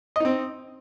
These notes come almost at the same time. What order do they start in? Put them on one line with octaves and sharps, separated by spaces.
D#5 D#4 C4